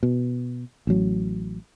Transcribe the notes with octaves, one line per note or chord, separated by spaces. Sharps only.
B2
A1 F#3